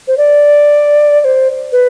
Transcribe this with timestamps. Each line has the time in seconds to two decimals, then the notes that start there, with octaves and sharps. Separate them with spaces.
0.08 C5
0.18 D5
1.21 D5
1.25 C5
1.72 B4